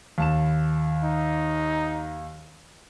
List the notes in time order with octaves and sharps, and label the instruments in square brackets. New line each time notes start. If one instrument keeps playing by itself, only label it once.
[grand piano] D#2 A5 E7
[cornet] D#4